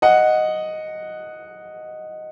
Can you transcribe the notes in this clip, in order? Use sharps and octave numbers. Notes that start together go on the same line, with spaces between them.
D#5 F#5